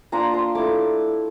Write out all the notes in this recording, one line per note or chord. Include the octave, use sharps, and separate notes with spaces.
A#3 D4 F4 A#5
C6
A3 E4 D6